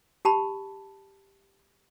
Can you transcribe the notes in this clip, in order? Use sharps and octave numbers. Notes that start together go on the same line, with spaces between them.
G4 A5 B5